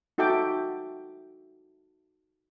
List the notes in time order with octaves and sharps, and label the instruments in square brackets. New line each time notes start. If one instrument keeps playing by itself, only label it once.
[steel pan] D#4 F#4 A4 E5 G5 D6